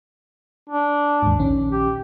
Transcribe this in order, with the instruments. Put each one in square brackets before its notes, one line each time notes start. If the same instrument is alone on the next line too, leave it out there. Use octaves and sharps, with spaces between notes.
[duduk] D4
[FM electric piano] D#2 G#2
A#1 D#3 C#4
[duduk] G4